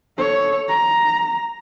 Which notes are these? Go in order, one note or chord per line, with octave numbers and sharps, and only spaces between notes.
A4 C#5
A#5